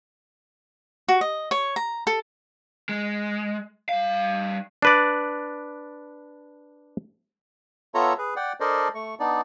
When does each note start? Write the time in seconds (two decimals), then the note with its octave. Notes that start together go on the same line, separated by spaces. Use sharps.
1.08 F#4
1.21 D#5
1.51 C#5
1.76 A#5
2.07 A4
2.89 G#3
3.89 G3 F5
4.82 D4 B4 D5
7.95 B3 F4 A4 C#5 E5 A#5
8.18 G#4 B4
8.36 D5 F#5 G5
8.60 D4 A4 A#4 C5 D5 D#5
8.95 A3 C#6
9.20 B3 D4 D#4 D5